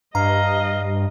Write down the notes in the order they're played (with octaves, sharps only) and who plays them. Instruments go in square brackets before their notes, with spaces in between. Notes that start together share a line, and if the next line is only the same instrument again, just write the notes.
[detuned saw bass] G2 [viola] D#5 [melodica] F5 [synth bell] A#5